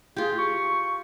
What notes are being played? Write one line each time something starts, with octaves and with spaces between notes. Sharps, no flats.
F4 G4 G#4
C#6